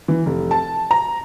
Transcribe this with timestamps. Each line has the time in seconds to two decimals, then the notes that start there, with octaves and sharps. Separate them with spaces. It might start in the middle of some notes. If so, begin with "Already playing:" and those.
0.08 E3
0.26 F1
0.51 A5
0.91 A#5